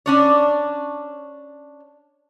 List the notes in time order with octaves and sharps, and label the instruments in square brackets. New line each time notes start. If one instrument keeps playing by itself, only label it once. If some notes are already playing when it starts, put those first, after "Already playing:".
[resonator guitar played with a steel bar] C#4 D4 C#5